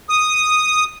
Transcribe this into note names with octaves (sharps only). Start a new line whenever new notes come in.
D#6